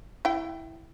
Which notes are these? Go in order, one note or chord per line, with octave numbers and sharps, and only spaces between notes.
E4 G5